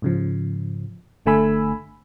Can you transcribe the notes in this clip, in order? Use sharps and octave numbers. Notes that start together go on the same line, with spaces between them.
G#2 C#3 F3
G1 D3 A3 G#5 B5 E6